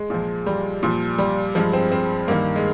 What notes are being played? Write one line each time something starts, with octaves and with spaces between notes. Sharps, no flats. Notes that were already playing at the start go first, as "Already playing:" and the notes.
Already playing: G#3
A#2 F3
G3
A#2 F3
G3
G2 F3 G#3
C4
C4
G2 D#3 A#3
G#3